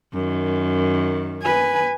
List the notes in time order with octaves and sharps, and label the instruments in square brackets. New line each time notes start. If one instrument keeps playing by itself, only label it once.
[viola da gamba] F#2 D#3
[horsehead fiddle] B4 G#5